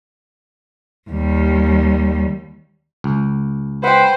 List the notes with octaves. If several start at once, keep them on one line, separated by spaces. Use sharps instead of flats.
D#2 G3
C#2
B4 C5 F#5 G5